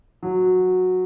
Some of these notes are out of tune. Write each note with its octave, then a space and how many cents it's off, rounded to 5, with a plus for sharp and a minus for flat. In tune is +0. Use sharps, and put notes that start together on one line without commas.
F#3 -10